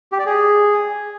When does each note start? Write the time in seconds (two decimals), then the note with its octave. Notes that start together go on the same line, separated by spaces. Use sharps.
0.12 G4
0.19 D5
0.26 G#4